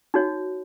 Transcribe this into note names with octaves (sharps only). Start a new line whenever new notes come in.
D#4 F#4 C#5